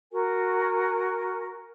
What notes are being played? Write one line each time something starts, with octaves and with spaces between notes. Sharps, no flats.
F#4 A#4 G#5